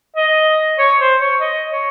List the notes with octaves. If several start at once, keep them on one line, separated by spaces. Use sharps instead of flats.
D#5
C#5
C5
C#5
D#5
C#5